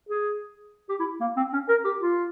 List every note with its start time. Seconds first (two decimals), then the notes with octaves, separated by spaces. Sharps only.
0.09 G#4
0.89 G4
1.00 E4
1.21 A#3
1.37 C4
1.53 C#4
1.69 A#4
1.85 G4
2.01 F4